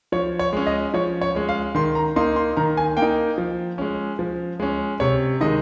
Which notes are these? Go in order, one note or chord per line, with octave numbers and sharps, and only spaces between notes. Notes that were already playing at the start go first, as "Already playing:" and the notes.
F3 C#5
C#5
G#3 C#4
D#5
F3 C#5
C#5
G#3 C#4
F5
D#3 C6
A#5
A#3 D#4 C6
C6
D#3 A#5
G#5
A#3 G5
D#4
F3
G#3 C#4
F3
G#3 C#4
C3 C#5
D#3 G#3 D#4 D#5